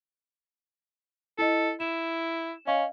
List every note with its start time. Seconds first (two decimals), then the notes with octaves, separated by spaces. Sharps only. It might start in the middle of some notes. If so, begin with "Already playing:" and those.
1.38 E4 A4 D#5
1.80 E4 E7
2.67 C#4 D#5 F5 C#6